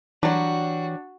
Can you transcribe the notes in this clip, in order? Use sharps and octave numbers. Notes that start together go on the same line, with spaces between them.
E3 F#3 G3 D4 F#4